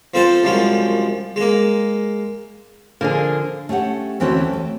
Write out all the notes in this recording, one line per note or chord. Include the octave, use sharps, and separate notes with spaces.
F3 C4 A4 C5
C2 F#2 F3 G#3
G#3 A#3
D3 F3 A#3 D4 G#4
A3 C#4 G4 A4 F#5
D2 E3 C4 C#4 F#4 A4
A3